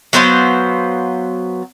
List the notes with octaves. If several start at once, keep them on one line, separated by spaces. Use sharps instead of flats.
F#3 B3 C5 F5